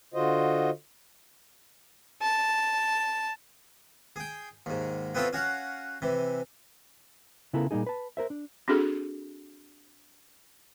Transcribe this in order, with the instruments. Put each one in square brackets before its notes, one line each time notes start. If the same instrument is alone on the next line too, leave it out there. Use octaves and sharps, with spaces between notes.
[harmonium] D3 F4 F#4 C5 D#5
[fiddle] A5
[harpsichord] G#4 G5
D#2 G#2
B3 C4 E4 F4 A4 C#5
C#4 F#4 F5 F#5
C3 E3
[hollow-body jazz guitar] C#3 B3 E4 F4 A4 A#4
A#2 G3 A#3 D#4 G#4
B4 A5
A#4 C5 E5
D4
[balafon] C4 D4 F#4 G#4 A4